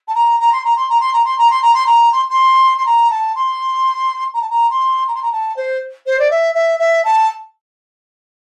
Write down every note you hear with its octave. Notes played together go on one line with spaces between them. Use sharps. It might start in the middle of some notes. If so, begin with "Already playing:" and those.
A5
A#5
A#5
C6
A#5
C6
A#5
C6
A#5
C6
A#5
C6
A#5
C6
A#5
C6
C6
C6
A#5
A5
C6
A#5
A5
A#5
C6
A#5
C6
A#5
A5
C5
C5
D5
E5
E5
E5
A5